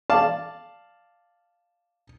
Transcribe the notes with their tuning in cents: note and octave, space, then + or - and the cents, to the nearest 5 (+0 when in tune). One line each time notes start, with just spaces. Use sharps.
D5 +0 F5 +0 A5 +0